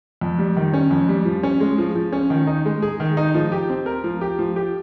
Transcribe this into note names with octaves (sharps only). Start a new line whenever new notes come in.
F2
G3
D#3
C#4
F2
G3
F3
C#4
G#3
F3
F3
C#4
D#3
D#4
G#3
G#4
D#3
D#4
F3
G4
C4
A#4
F3
G4
F3
G4